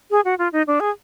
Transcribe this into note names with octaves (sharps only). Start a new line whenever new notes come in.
G#4
F#4
F4
D#4
D4
G#4